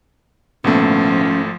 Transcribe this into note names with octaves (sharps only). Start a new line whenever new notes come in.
G#1 D2 A#2 F3 A3 B3 C#4